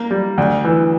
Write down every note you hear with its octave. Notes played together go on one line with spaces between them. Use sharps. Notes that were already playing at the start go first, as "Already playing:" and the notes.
Already playing: A#3
G3
D2
E3